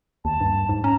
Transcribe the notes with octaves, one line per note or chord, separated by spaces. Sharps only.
D#2 A5
G2
G#2
C#4 A#5